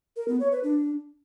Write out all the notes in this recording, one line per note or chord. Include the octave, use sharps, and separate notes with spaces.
A#4
B3
C#5
B4
D4